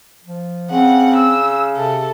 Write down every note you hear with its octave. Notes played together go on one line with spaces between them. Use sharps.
F3
C#3 C4 F#5
E6
C3 A4